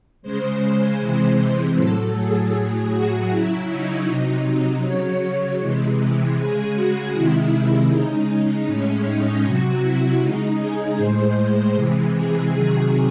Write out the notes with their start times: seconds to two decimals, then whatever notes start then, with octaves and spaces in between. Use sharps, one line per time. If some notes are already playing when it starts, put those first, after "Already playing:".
0.22 C#3 G#3 C5
0.99 C3 E3 G#3
1.76 A2 F#3 A4
2.15 G#4
2.52 A2 F#3
2.91 F#4
3.30 C#3 F#3 E4
3.68 D#4
4.06 C3 F#3
4.83 C#3 F#3 C#5
5.60 C3 E3 G#3
6.37 C#3 G#3 G#4
6.75 F#4
7.13 C3 D#3 G#3 E4
7.90 C#3 G#3 D#4
8.67 A2 G#3 C#4
9.05 D#4
9.44 C3 F#3 F#4
9.82 E4
10.20 C#3 G#3 D#4
10.59 G#4
10.97 A2 G#3 C5
11.74 C3 E3 G#3
12.12 G#4
12.51 C3 D#3 F#3